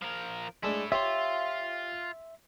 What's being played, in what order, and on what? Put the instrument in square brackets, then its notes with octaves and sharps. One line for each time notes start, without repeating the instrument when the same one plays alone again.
[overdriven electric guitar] F3 A#4
[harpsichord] G#3 A3 D4 [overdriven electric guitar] E4 A4
[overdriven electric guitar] F4 [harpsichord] G4 C5 C#5 [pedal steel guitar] E5 C6